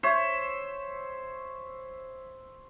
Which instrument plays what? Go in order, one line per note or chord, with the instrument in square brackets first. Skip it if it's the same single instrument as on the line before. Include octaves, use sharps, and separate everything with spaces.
[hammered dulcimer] C5 C#5 E5